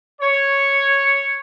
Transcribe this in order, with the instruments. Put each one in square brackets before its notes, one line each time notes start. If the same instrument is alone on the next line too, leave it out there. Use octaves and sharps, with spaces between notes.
[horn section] C#5